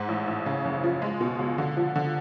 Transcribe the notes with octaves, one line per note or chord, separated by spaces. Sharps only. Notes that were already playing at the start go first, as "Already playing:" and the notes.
Already playing: G#2
A1
A1
C#3
F#1
F3
G#3
B2
C#2
D3
F3
D3